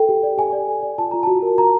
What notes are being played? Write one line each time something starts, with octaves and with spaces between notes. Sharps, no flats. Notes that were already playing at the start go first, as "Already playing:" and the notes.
Already playing: A4 G5
G4
D5
G4 G#5
D5
A4
D5
F4 A5
F4 A#5
F#4 A5
A#4
A#4 A#5